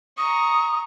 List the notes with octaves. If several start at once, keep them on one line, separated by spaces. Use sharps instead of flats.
A#5 C#6 D#6